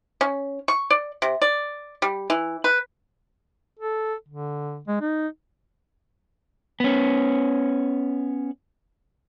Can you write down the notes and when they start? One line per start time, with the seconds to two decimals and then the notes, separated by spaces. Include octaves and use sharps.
0.21 C#4
0.68 C#6
0.90 D5
1.22 C3
1.42 D5
2.02 G3
2.30 E3
2.64 B4
3.79 A4
4.28 D3
4.88 G#3
5.01 D#4
6.80 B3 C#4